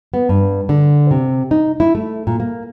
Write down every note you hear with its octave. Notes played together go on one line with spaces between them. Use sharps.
B3
G2
D3
C3
D#4
E4
A3
A#2
A#3